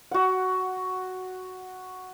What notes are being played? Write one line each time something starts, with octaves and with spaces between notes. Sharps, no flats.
F#4 F#5